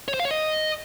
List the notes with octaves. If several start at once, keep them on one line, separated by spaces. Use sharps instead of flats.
C#5
C5
F5
C#5
D#5